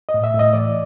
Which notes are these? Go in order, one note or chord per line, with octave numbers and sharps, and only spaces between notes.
D#5
A2
E5
A2
D#5
E3 D5